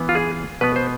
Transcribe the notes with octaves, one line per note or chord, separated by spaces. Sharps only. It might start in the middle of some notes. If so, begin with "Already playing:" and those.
Already playing: E3 B3
F4
G#4
B2 B3 B4
C5